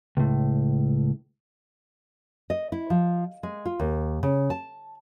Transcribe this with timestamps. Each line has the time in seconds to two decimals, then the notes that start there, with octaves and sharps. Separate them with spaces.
0.17 C#2 A2
2.50 D#5
2.72 E4
2.90 F3
3.43 G#3
3.65 F4
3.80 D#2
4.23 C#3
4.50 A5